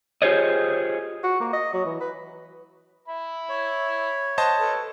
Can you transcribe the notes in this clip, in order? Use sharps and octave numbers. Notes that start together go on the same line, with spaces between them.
F4 G4 G#4 C5 C#5 D#5
F#4
A#3
D#5
F#3
E3
B4
E5 B5
C#5
C5 D#5 F#5 A5
A4 B4